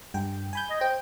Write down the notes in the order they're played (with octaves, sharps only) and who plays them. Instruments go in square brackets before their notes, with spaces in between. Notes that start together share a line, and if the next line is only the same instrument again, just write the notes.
[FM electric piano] G2 G5
G#5 B5 G6
[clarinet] D#5
[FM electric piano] C5 [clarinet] G5